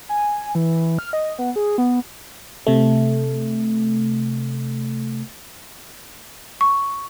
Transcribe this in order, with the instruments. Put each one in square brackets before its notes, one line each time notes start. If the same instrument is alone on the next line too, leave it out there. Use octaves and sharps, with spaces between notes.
[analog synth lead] G#5
E3
F6
D#5
B3
G#4
B3
[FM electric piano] C3 A3
[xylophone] C#6